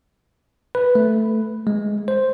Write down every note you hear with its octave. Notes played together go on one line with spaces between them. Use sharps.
B4
A3
G#3
C5